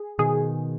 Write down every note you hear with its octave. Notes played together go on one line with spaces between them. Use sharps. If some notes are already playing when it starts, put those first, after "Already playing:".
Already playing: G#4
B2 D#3 G#4